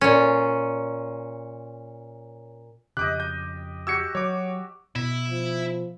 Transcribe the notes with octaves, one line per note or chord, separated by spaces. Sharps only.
A#2 C#4
F2 C#3 G4 D#5 D6 F#6
G6
F#4 G4 E6 G#6 C#7
F#3 C#5 D6
B2 E4
F3